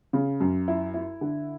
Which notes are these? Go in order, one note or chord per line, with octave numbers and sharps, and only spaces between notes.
C#3
F#2
E4
E4
D3